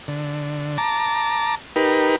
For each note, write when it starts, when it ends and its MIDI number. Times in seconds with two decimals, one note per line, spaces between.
0.08 0.78 50
0.78 1.55 81
0.78 1.55 82
0.78 1.55 86
1.76 2.16 63
1.76 2.16 67
1.76 2.16 70
1.76 2.16 71